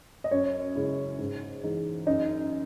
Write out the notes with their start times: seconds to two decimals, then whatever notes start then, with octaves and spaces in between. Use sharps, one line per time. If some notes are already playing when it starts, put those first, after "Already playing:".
0.24 D#5
0.31 F#2 C#5
0.75 C#3 G#3 C#4 E4
1.19 G#2
1.64 E3 G#3 D#4
2.06 F#2 D#4 D#5